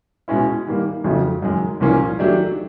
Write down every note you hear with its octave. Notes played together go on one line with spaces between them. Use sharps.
B2 G#3 C#4 E4
G#2 D#3 G3 A#3
F2 C#3 F#3 A3
F#2 D#3 G#3
C2 A#2 F3 A#3 C#4
D#3 F#3 A3 D4 G4